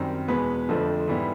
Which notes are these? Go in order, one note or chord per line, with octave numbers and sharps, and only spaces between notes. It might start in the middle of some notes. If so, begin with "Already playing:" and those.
Already playing: F#2 D#3 G3 C4
E2 B2 G#3 B3 B4
F2 D3 F3 A3 C4
G#2 E3 G3 B3